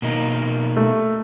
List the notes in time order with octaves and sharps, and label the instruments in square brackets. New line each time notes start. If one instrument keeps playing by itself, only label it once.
[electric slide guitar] B2 A#3 D#4
[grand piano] A3